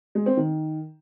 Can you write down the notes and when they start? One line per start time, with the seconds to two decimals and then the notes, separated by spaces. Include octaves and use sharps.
0.15 G#3
0.26 C4
0.37 D#3